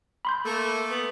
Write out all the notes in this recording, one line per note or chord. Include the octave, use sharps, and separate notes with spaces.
B5 C6 G6
A3 A#3
B3